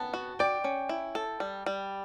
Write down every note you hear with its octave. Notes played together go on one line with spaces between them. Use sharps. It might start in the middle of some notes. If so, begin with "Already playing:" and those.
Already playing: B3 A5
F#4
D5 G5
C#4
E4
A4
G3
G3